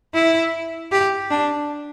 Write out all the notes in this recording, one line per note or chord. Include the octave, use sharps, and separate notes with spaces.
E4
G4
D4